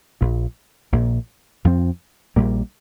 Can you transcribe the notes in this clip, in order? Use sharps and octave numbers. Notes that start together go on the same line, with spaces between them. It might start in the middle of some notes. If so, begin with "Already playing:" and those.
A#1 A#2 F3
A#1 A#2 A#3
F2 F3 C4
A#1 A#2 G3 A#3